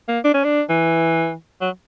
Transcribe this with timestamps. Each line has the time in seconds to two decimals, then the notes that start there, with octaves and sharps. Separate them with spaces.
0.08 A#3
0.24 D4
0.34 C#4
0.44 D4
0.69 E3
1.61 F#3